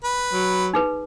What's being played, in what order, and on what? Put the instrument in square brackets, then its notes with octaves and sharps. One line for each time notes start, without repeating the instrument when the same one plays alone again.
[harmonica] B4
[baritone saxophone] F#3
[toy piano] D#4 G#4 B4